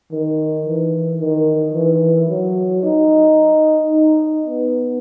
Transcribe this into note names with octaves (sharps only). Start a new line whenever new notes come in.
D#3
E3
D#3
E3
F#3
D#4
D#4
B3